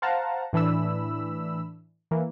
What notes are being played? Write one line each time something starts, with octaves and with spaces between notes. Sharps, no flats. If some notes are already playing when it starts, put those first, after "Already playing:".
C5 F5 F#5 A5 A#5
A2 E3 D4 B5 E6
E3 A#3